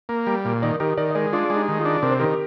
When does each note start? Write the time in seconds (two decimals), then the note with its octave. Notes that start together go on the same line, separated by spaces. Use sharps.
0.09 A#3
0.27 G3
0.45 A#2
0.62 D#3 A#4 D5
0.80 D#3 G4 A#4
0.97 D#3 A#4 D5
1.11 D#5
1.15 G#3 A#4 D5
1.32 D4 F4 G#4
1.50 G#3
1.56 D#4 G4
1.68 D#3
1.80 F4 G#4
1.85 D4
2.03 C3 A#4
2.11 C5
2.19 D#3 G4 A#4